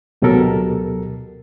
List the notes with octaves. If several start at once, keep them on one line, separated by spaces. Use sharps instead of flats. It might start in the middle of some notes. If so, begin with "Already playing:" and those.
D2 B2 F#3 G4 A4 A#4